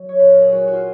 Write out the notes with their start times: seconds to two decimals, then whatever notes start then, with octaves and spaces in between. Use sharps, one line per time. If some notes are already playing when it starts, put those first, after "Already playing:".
Already playing: F#3
0.09 C#5
0.19 A#2 B4
0.30 A#4
0.41 G#4
0.52 F#3 F#4
0.68 F#4
0.73 F4